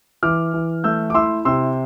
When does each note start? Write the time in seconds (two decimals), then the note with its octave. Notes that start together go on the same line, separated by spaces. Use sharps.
0.23 E3 D6 F6
0.54 E3
0.84 A3 E6 G6
1.10 D6
1.14 E4 C6 E6
1.45 C3 C6 E6